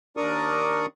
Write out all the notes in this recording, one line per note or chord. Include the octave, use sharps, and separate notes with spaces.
D#2 D4 A#4 D5 C#6 D#6